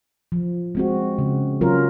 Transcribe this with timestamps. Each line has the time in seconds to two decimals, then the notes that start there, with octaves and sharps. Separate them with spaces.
0.32 F3
0.75 G#3 C4 F#4
1.18 C#3
1.61 F#3 C#4 F4 A#4